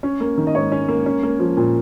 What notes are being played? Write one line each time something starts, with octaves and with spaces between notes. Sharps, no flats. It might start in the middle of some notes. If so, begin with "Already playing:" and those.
C#4
A#3
D#3
D#5
G#2 C#5
C#4
A#3
C#4
A#3
F3
A#2